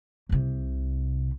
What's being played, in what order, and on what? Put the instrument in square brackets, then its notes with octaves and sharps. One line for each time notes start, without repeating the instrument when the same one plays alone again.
[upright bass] C2 C3